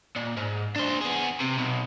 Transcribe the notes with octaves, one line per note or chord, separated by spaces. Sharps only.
A#2
G#2
D4 C5
B3 G#4
C3
B1 B2